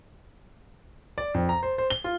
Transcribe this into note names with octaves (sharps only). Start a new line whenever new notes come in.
D5
F2
A#5
C5
C5
G7
F4